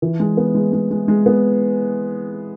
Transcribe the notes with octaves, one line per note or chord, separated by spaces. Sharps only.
E3
G#3
B3
G#3
G#3
G#3
G#3
B3